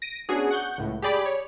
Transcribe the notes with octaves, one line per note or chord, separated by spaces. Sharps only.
A#6 D7 D#7
B3 C#4 D4 F#4 G#4
F#5 C#6 G6
C#2 A2
G4 G#4 D5 B5
C#5